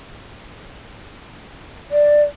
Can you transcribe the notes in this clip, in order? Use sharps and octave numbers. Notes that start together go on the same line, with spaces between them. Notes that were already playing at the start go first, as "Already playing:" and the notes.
D5